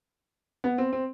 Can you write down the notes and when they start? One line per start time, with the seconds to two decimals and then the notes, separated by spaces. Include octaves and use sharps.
0.64 B3
0.78 C4
0.93 C4